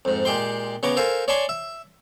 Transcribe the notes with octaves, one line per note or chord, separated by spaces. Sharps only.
F2 G#2
A#2 G#3 G4 G5 C6
C#3 B3 C#5 A#5 D6
A4 A#4 C5 F5 G#5
C#5 D5 G#5 A5 C6 C#6
E5